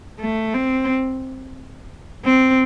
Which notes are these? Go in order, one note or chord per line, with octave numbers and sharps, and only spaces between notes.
A3
C4
C4